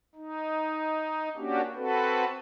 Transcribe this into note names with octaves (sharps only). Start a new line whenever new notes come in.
D#4
A#3 C#4 D4 F#4 G4
C4 F#4 A4 B4